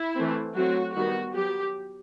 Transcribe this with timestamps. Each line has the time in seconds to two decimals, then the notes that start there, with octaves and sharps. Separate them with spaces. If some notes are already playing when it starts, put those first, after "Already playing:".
Already playing: E4
0.16 E3 A3 C4
0.55 F#3 A3 C4 F#4
0.95 D#3 G3 B3 F#4
1.34 F#3 B3 G4